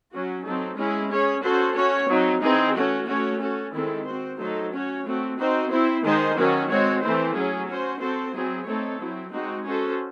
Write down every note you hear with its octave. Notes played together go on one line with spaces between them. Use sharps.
F#3 C#4 F#4
F#3 C4 D#4 A4
G#3 C#4 E4 G#4
C#4 G#4 C#5
C#4 F#4 A4 C5
C#4 F#4 C#5
F#3 C4 D#4
E3 C4 D#4 G#4
A3 C#4 F#4
A3 C#4 F#4 C#5
C#4 F#4 A4
D#3 G#3 C4 E4 A4
C4 F#4 C5
F#3 A3 D#4 A4 C5
C#4 F#4 C#5
A3 C4 F#4
C4 D#4 F#4 C5
C4 E4 C5
D#3 G#3 D#4 G#4 C5
D#3 F#3 C#4 F#4
G#3 C4 F#4 C#5
E3 A3 C4 E4 C5
F#3 C#4 G#4
C#4 F#4 C5
C4 F#4 A4 C5
F#3 C4 E4 G#4
A3 C4 D#4 A4 C#5
F#3 C4 E4
G#3 C4 D#4 F#4
C#4 F#4 A4 C5